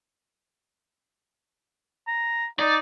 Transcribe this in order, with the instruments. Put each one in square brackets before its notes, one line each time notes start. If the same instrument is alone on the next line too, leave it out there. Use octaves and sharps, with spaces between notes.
[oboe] A#5
[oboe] D#4 [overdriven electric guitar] D5